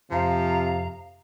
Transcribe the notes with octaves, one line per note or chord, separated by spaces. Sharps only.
F2 C3 F3 F5 A#5